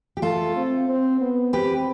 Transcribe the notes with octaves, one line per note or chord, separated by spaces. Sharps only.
G4
A3 F4 A4
C4
C4
B3
C4 G4 B4